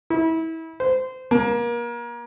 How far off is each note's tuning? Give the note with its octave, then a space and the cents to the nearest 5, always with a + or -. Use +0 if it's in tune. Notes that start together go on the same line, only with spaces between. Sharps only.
E4 -30
C5 -20
A#3 +30